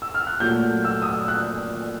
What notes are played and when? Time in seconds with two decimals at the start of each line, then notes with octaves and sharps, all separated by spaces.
0.02 E6
0.14 F6
0.27 F#6
0.40 A#2 F#3 A3 G6
0.84 E6
1.02 D#6
1.06 E6
1.28 F#6